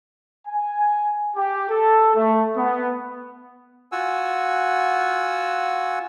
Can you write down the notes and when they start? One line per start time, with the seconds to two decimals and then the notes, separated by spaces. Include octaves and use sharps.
0.47 G#5
1.36 G4
1.69 A4
2.15 A3
2.57 B3
3.92 F4 F#4 F#5 G#5 E6